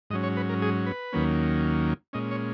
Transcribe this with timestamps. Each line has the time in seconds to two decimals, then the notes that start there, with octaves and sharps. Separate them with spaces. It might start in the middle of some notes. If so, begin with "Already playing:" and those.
0.10 G#2 F#3 C#4 D#5
0.23 C#5
0.37 B4
0.49 A#4
0.62 G#4
0.86 B4
1.13 D#2 D#3 F#3 A#3 C#4
2.13 A#2 G#3 C#4 D#5
2.31 C#5